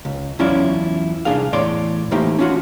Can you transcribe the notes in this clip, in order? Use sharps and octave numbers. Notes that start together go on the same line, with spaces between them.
C#2
E2 F#3 C#4 E4 F4 D5
C2 D4 G#4 F5
E2 A2 C#5 D5 C6
E3 A3 A#3 D#4 G4 C5
C#4 D4 F4 F#4